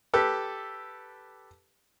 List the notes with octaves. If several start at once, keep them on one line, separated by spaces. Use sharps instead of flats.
G4 A4 B4